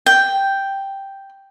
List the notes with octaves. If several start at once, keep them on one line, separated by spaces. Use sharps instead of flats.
G5